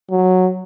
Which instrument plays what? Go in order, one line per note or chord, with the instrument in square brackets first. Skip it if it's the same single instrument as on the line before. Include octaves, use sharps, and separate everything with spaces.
[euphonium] F#3